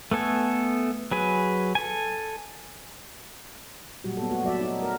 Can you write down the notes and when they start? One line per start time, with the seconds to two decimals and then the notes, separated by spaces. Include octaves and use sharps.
0.11 A3 B3 A4 G#5
1.11 F#3 G#4 B4 G#5
1.75 A4 G#5
4.04 A#2 F#3 G3 F#4
4.17 B3 A4
4.31 A3 F#4
4.45 F#3 D5 E5
4.61 D#4
4.79 A3 A#4